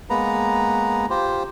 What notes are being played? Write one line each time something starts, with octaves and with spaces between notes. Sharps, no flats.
G#3 A#3 B3 B4 A#5
F4 G4 C5